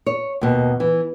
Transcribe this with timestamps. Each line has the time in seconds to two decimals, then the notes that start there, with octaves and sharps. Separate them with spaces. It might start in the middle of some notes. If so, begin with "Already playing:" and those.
0.06 C#5
0.41 D#2 B2
0.80 E3